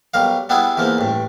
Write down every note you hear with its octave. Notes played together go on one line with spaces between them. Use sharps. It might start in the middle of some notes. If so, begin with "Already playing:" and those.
B1 G3 A#4 F5
G3 B3 D4 E4 G#4
E2 E3 F3 A#3
A1 G2